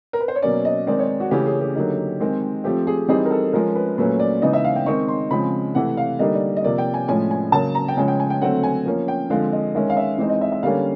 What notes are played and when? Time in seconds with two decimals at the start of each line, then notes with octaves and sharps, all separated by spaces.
0.13 A#4
0.20 B4
0.28 C5
0.36 C#5
0.42 B2 F#3 A#3 C#4 D5
0.65 D#5
0.87 D#3 G#3 C4 D#4 D5
0.99 C#5
1.20 F#4
1.31 C#3 E3 A3 C#4 G4
1.46 G#4
1.61 G4
1.76 D3 F#3 A#3 D#4
2.20 D#3 G#3 C4
2.64 F3 A3 C4 G4
2.87 G#4
3.08 E3 G3 C4 D#4 G#4
3.25 A#4
3.31 A4
3.53 F3 G#3 C#4 A#4
3.75 B4
3.98 A#2 F#3 A3 C#4 B4
4.20 D5
4.42 C#3 E3 G#3 B3 D#4 D#5
4.53 E5
4.64 F5
4.76 G5
4.86 D#3 G#3 C4 D#4 C#6
5.08 C6
5.30 C#3 F3 G#3 C4 B5
5.75 C3 E3 A3 F#5
5.97 F5
6.19 D3 G3 A#3 D#4 D#5
6.35 D5
6.57 D#5
6.64 C3 F3 A#3 D5
6.78 G5
6.94 G#5
7.08 A2 F3 G#3 C#4 G#5
7.31 G#5
7.52 C#3 F#3 A#3 A5
7.75 A#5
7.88 G5
7.97 C#3 F3 G#3 C#4 G#5
8.08 G5
8.20 G#5
8.30 G5
8.41 D3 F#3 A3 C4 F#5
8.63 G#5
8.85 F3 A#3 C#4
9.08 G5
9.30 D3 F3 G#3 C4 F5
9.52 D#5
9.74 D#3 G#3 C#4 E5
9.90 F5
9.97 E5
10.18 E3 G#3 C4 D#4
10.30 D#5
10.41 E5
10.52 E5
10.63 D3 G3 A#3 C#4 F5